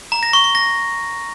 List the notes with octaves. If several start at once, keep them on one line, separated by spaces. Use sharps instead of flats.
A#5
A#6
C#6
C#6
A#6